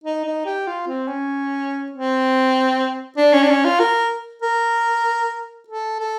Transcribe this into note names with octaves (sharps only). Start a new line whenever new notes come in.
D#4
D#4
G4
F4
C4
C#4
C4
D4
C#4
D4
C#4
F4
A#4
A#4
A4
A4